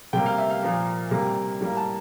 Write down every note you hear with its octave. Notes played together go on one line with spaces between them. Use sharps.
C3 G3 A#3 G5
F5
E5
F5
A#2 F3 A#3
C3 G3 A#3
A2 G3 A#3
A5